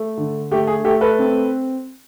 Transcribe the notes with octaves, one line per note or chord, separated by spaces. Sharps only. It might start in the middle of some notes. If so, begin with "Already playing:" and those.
Already playing: A3
D3
A3 G4
G#4
A3 G4 A4
A4 B4
C4